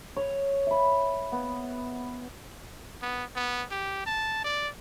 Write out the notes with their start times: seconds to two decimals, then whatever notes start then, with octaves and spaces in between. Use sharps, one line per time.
0.16 C#5
0.67 E5 B5
1.32 B3
3.02 B3
3.36 B3
3.71 G4
4.06 A5
4.44 D5